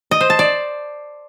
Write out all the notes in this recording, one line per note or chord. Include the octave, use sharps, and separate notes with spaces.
D#5
C5
A5
D5